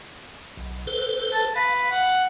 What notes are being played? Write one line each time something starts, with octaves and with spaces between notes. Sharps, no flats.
B1
A4 B4 C5
A5
B4 F5
F#5